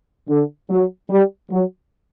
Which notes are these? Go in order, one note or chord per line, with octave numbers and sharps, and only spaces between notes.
D3
F#3
G3
F#3